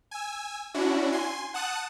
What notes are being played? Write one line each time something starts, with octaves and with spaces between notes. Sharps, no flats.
G#5 E6
C#4 D4 E4 F#4
G#5 C6
F#5 A5 D#6 F#6